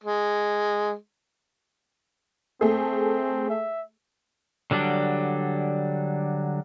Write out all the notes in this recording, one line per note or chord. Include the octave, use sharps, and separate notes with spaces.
G#3
A3 C4 G#4
E5
D3 F#3 G3 D4